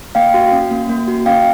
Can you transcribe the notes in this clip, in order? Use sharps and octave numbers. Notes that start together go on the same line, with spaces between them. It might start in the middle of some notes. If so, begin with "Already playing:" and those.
A#3 F5 G5
F#4
C#4
A#3
A#3
F#4
C#4 F5 G5